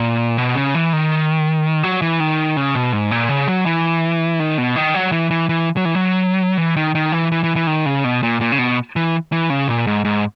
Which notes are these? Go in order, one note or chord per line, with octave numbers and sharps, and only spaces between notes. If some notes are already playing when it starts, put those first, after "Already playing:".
Already playing: A#2
B2
C#3
E3
D#3
F#3
E3
D#3
C#3
B2
G#2
A#2
C#3
F#3
E3
D#3
B2
D#3
F#3
E3
E3
E3
F#3
E3
F#3
E3
D#3
D#3
E3
E3
E3
E3
D#3
C#3
B2
A#2
A#2
C#3
B2
E3
E3
C#3
A#2
G#2
G#2